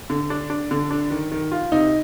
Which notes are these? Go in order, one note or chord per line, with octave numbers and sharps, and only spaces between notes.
D3
D4
D4
D3
D4
D#3
D#3
F4
C3 D#4